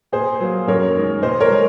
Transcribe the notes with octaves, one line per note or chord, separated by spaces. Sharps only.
A#2 G#4 C5
F#3 A#3
F#2 A#4 C#5
D#3 G#3
A#2 C5 D#5
A#4 C#5
G#3